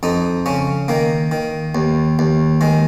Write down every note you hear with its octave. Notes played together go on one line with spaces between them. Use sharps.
F2 D#4
C#3 C#4
D#3 A#3
D#3
D#2
D#2
D#3 G#3